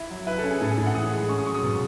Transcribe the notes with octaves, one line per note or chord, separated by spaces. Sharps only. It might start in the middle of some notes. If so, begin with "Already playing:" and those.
Already playing: E4
F#3
E4 B4
A4
C#4
G#4
A2 A4
G#4
A2 A4
F#5
E3 D#6
G#3
C#4 C#6
D#6
F#3 C#6
D#6
B2 C#6